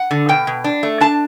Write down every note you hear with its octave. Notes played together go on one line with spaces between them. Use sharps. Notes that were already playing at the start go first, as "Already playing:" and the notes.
Already playing: F#5
D3
B2 G5
B2
D4
A3
D4 A5